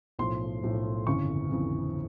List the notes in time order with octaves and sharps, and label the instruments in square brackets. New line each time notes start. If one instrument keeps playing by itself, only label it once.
[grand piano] B1 A2 F3 C6
B1 A2 F3
G1 F2 C#3 E3 C#6
G1 F2 C#3 E3